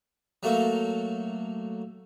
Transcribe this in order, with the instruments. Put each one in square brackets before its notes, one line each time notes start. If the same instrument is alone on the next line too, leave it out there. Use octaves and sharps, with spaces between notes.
[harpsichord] F#3 A3 A#3